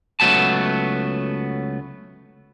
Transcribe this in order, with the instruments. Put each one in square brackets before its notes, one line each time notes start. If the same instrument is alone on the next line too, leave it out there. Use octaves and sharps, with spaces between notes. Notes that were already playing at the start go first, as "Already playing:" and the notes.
[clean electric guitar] C#2 E3 F#3 A3 B3 A5